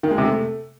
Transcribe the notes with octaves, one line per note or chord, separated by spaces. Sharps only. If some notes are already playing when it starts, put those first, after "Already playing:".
D#3
G#3
C3
A3